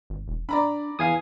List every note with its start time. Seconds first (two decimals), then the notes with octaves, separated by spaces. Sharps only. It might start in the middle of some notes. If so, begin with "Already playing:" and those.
0.10 G#1
0.28 E1
0.49 D4 D5 A#5 B5
0.99 E2 F5 G#5 D#6